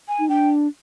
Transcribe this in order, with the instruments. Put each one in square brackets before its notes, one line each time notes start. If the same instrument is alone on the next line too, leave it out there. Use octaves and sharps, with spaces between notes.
[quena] G#5
[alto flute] D#4
[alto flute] D4 [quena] G5